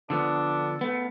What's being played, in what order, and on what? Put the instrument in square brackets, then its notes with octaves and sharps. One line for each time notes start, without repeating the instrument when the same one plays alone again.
[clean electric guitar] D3 F3 B3 [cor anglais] D4 [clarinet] A4
[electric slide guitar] A3 B3